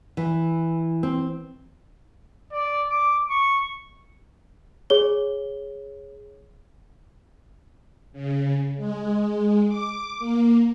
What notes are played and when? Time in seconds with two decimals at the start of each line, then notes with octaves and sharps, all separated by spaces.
0.17 E3
1.03 C4
2.52 D5
2.89 D6
3.30 C#6
4.90 G#4 C#5 G7
8.13 C#3
8.77 G#3
9.68 D6
10.19 A#3